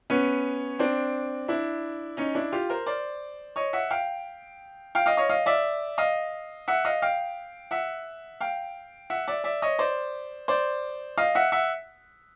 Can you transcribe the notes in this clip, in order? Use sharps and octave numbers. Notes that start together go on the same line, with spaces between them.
B3 C#4
C4 D4
D4 E4
C#4 D#4
D4 E4
F4 G4
A#4 C5
C5 D5
C#5 D#5
E5 F#5
F5 G5
F5 G5
D#5 F5
C#5 D#5
D#5 F5
D5 E5
D#5 F5
E5 F#5
D#5 F5
F5 G5
E5 F#5
F5 G5
E5 F#5
D5 E5
D5 E5
C#5 D#5
C5 D5
C5 D5
D#5 F5
E5 F#5
E5 F#5